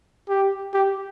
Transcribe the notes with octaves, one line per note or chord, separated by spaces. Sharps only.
G4
G4